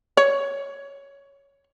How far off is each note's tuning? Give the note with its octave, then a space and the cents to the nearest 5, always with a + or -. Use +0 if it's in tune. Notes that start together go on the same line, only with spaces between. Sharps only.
C#5 +5